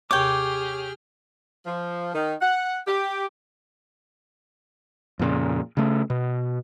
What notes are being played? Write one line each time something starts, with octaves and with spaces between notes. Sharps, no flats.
D#2 C3 G4 G#4 C#5 G5 D6 F6
F3
D#3
F#5
G4
F2 A#2 C#3
C#3 A3
B2